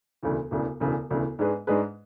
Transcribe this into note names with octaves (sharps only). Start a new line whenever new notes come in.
E1 D2 C#3 E3
E1 D2 C#3 E3
E1 D2 C#3 E3
E1 D2 C#3 E3
G#2 G#3 D4 G#4 B4
G#2 G#3 D4 G#4 B4